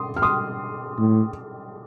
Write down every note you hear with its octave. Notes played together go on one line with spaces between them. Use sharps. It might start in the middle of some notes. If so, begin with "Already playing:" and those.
Already playing: C6 D#6
F6
C6 D#6
A2